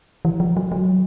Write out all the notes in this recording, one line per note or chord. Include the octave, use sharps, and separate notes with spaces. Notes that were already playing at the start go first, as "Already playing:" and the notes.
E3
F3
F#3
F#3